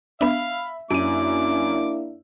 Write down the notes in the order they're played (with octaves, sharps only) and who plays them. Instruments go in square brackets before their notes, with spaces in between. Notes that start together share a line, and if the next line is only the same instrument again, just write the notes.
[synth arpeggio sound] B3 D4 [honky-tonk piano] E5 B5 [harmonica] F5
[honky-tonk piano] F#2 [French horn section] A#3 D4 E4 [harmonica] D6 [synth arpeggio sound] D7 D#7